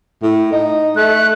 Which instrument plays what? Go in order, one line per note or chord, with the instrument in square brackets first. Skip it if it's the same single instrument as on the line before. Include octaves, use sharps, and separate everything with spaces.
[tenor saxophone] A2
D#4
[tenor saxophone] A3 [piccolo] F#6